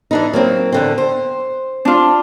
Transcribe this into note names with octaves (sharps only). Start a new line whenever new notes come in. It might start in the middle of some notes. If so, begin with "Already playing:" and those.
E3 D4 D#4
F#3 A#3 C4
E2 D3 C4
C5
D4 F4